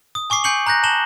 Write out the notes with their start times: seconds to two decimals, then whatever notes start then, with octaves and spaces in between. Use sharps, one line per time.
0.15 D#6
0.30 G#5 C#6 D6 C7
0.44 G#5 C#6 G6 C7 C#7 F#7
0.66 A#5 F#6 G6 A#6
0.83 A5 E7 F#7 G7